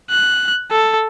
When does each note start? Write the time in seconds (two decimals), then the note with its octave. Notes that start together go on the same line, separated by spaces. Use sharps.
0.10 F#6
0.71 A4